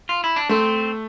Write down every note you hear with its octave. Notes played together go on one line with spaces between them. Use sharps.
F4
E4
D4
A3 C4